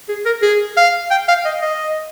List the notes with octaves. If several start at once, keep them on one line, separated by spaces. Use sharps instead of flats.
G#4
A#4
G#4
F5
G5
F5
D#5
D#5